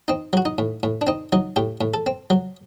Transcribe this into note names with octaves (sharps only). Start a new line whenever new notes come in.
C4 D#4
F#3 F#4
D#4
A2
A2
D4
C4 D#4
F#3 D#4
A2 G4
A2
A4
C4
F#3